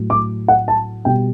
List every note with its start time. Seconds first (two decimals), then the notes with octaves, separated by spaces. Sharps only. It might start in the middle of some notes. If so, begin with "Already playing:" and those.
Already playing: A2 F#3
0.10 D6
0.48 F#5
0.68 A5
1.05 B2 G3 G5